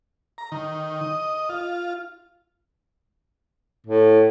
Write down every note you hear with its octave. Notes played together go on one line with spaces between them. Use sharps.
A#5
D#3
D#5
F4
A2